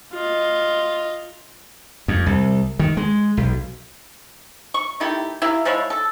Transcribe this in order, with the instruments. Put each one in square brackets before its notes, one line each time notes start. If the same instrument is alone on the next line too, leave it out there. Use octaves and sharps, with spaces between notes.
[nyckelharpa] F4 D#5
[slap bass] F2
C2
D#3
G#3
B1
[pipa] C#6
D#3 A3 E4 G4
E4 G4 A#4 F5
F3 G#3 E4 C#5
A4